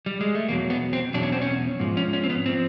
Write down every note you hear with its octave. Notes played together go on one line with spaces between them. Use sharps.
G3
G#3
A3
E2 B2 F#3 A#3
B3
C4
E2 B2 F#3 D4
C#4
C4
C#4
G#2 F3
C#4
C#4
C4
B3
F3 C4